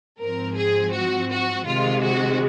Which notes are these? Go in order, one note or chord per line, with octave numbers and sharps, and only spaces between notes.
G#2 F3 C4 A#4
G#4
F#4
F#4
C3 D#3 G#3 F4
F#4